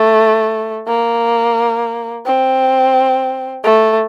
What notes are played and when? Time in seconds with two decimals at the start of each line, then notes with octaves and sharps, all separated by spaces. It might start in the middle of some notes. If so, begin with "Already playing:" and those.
Already playing: A3
0.87 A#3
2.26 C4
3.64 A3